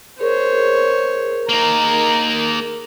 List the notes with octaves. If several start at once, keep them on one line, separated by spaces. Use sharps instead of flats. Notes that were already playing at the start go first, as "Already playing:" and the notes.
G#4 A#4 C5 C#5
A#3 D#4 A#5